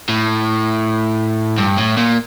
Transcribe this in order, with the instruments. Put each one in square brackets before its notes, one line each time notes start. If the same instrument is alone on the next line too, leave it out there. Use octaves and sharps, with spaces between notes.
[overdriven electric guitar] A2
G2
A2
A#2